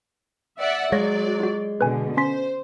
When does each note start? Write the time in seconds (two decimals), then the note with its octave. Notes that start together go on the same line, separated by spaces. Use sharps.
0.59 D5 E5 F#5
0.92 F#3 G#3 C#5 D5 F5 A#6
1.40 F4 F#4
1.81 B2 D3 B4 G#5
2.17 C#4 C5 C6 B6